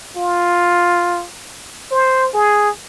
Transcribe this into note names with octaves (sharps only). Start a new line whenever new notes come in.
F4
C5
G#4